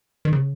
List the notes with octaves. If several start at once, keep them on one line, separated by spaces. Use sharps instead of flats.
D#3
C#3